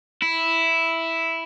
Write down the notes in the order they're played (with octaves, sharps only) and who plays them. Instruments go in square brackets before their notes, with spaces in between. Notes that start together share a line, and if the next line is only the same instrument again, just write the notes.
[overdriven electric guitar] E4